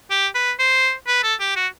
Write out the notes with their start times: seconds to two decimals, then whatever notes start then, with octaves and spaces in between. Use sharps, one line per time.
0.10 G4
0.35 B4
0.59 C5
1.07 B4
1.23 A4
1.40 G4
1.56 F#4